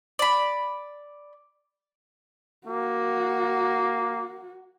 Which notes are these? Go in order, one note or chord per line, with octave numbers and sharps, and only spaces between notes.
D5 B5
A#3 F#4